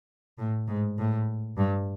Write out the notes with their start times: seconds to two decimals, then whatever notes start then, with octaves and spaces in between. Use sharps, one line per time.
0.38 A2
0.68 G#2
0.98 A2
1.58 G2